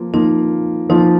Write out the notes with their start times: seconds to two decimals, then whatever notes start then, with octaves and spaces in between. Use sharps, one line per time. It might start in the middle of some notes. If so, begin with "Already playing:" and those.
Already playing: F3 A#3 F4
0.14 F3 A#3 D#4 F4
0.89 F3 A#3 D#4 F4